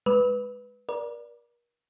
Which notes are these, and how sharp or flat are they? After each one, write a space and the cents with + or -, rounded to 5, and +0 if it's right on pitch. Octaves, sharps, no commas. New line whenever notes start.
G#3 +0 B4 +0 E6 -35
A#4 +40 D5 +0